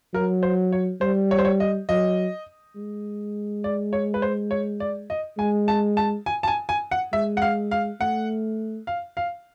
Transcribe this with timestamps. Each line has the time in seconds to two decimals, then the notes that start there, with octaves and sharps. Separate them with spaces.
0.14 F#3 A#4
0.43 C5
0.72 C#5
1.01 G3 C5
1.31 C#5
1.39 C5
1.45 C#5
1.60 D#5
1.89 F#3 D#5
2.76 G#3
3.64 D5
3.93 C#5
4.14 B4
4.22 C5
4.51 C#5
4.80 D5
5.10 D#5
5.38 G#3 G#5
5.68 A5
5.97 A5
6.26 G#5
6.43 A5
6.48 G#5
6.69 G#5
6.91 F#5
7.13 G#3 E5
7.37 F#5
7.42 F5
7.71 F5
8.01 A3 F#5
8.87 F5
9.17 F5